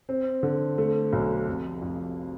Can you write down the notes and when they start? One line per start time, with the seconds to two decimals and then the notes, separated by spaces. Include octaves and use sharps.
0.09 C4
0.43 D3
0.78 A3
1.13 B1
1.47 F1
1.81 F2